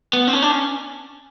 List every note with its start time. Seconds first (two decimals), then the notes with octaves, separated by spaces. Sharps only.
0.13 B3
0.27 C4
0.33 C#4
0.42 D4
0.52 C#4